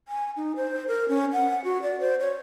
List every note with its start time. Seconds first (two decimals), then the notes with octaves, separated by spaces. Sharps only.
0.08 G#5
0.36 D#4
0.56 C5
0.88 A#4
1.08 C#4
1.33 F#5
1.64 F#4
1.82 D5
2.00 C5
2.20 C#5